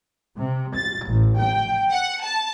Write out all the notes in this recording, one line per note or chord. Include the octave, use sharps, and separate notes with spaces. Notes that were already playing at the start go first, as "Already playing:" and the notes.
C3
A6
A1
G5
F#5
A5